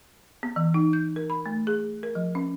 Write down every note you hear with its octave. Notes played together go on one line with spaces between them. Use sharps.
B3
E3
D#4
G6
A#4
B5
A3
G#4
A#4
F3
C#4